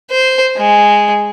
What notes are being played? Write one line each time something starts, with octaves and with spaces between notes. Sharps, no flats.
C5
G#3